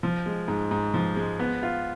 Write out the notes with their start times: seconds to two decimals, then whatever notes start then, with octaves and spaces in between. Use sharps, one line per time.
0.03 F3
0.26 G#3
0.48 G#2
0.71 G#2
0.94 F3
1.16 G#3
1.39 B3
1.63 F4